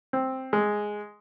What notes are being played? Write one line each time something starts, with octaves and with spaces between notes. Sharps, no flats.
C4
G#3